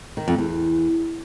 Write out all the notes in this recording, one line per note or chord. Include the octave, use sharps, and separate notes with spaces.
D#3
F2
E2